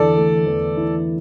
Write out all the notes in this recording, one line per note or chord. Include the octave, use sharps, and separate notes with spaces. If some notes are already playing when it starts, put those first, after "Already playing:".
Already playing: E2 D3 E4 A4 D5
A3
E2
E4